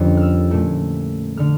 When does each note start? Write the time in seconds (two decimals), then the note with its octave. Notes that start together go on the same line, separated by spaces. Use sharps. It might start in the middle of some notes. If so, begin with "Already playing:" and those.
Already playing: F2 D3 G3 A#3 C#4
0.17 E6 F6
0.51 A#2 A3 E4
1.37 D3 A3 F6